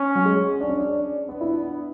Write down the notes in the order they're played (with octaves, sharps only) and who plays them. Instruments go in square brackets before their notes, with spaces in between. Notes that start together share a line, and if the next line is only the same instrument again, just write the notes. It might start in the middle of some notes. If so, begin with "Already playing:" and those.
Already playing: [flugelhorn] C#4
[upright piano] F#3
G#3
D4
C#4
D4
[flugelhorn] B3 [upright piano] D4
[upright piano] E4
D4